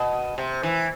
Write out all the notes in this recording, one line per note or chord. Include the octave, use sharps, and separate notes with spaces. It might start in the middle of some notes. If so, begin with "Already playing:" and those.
Already playing: B2
C3
E3